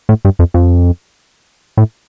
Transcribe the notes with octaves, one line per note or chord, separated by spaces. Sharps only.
A2
G2
F2
F2
A2